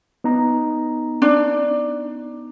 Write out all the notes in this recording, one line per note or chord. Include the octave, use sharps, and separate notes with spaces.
B3 D#4 A#5
D4